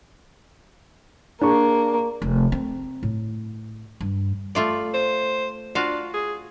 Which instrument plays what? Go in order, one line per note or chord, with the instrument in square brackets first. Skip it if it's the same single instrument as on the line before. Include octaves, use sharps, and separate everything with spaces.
[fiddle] A#3 [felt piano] D4 G#4 C#6
[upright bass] F1
C4
A2
G2
[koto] A3 F4 D5
[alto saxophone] C5
[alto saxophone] D4 [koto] F4 F#4 F5
[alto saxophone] G#4